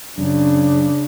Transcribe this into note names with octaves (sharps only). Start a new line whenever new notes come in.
F#2 C#3 D4